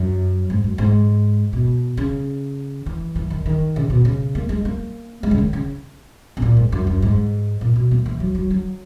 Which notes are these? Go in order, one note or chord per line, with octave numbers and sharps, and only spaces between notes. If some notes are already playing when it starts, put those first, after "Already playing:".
Already playing: F#2
G#2
F#2
G#2
B2
C#3
E3
E3
D#3
D#3
C#3
B2
C#3
A#3
G#3
A#3
G#3
C#3
D#3
C#3
B2
A#2
G#2
F#2
F#2
G#2
A#2
B2
A#3
E3
F#3
F#3
F#3